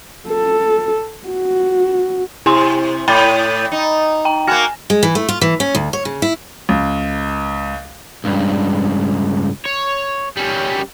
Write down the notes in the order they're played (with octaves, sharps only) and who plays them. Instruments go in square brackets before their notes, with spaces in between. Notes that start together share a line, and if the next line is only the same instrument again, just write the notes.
[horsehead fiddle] A4
F#4
[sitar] C3 [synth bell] E4 G#5 C6
[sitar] A2 [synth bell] G5 B5 A6
[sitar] D#4
[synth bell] G5 A#5
[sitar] A#3 F#4 [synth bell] G#5 F6 A#6
[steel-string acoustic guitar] G#3
E3
A3
F4
E3
C#4
D2
C#5
C#3
E4
[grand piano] C#2
[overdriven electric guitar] C#2 G2
C#5
G3 C#4